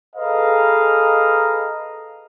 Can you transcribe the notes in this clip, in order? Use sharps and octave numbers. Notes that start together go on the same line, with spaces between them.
G#4 A4 B4 D#5 F5 A#5